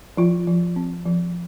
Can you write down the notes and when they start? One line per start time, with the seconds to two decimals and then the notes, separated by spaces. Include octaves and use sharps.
0.17 F3 F4
0.47 F3
0.76 C4
1.05 F3